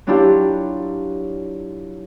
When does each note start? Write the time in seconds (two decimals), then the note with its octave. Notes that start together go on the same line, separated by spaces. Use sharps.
0.07 F#3 D4 E4 F4 G4